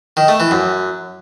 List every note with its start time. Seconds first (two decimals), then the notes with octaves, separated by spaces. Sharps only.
0.17 D#3
0.28 A3
0.40 E3
0.51 F#2